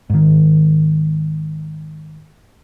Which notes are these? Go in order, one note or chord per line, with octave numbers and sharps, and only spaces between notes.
G#2 D#3